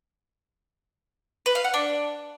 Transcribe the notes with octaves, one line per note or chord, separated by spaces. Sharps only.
B4
F5
F#5
D4